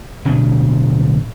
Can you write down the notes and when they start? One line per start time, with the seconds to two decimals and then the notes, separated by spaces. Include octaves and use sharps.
0.25 D1 B2 B3 D4